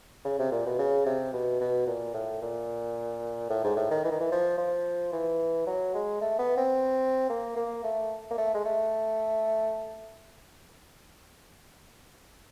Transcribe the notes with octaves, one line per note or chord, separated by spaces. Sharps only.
C#3
C3
A#2
B2
C#3
C3
B2
B2
A#2
A2
A#2
A2
G#2
A2
D#3
E3
D#3
E3
F3
F3
E3
F#3
G#3
A3
B3
C4
A#3
A#3
A3
A#3
A3
G#3
A3